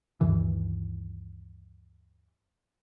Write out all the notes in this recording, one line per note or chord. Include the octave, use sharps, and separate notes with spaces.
D2 G2 D#3 E3